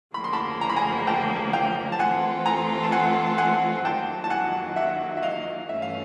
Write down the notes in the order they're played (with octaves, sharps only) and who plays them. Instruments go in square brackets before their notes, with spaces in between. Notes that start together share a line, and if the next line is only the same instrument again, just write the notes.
[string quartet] D2 C#3 F3 A#3 [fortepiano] B5
[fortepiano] C6
A5 B5
A#5
B5
G#5 A#5
G5 A5
F5 G5
A5
[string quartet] E3 A3 C4 F4 A4 [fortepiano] F#5 G#5
[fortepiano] G#5 A#5
A5
F#5 G#5
A5
F#5 G#5
[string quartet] F#2 D#3 F#3 A#3 [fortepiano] G5 A5
[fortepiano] A5
F#5 G#5
E5 F#5
E5
D#5 F5
[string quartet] G2 E3 A3 C#4 [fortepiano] E5
[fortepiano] F5